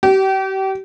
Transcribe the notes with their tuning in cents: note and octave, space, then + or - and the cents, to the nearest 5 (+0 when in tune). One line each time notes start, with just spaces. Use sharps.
G4 -35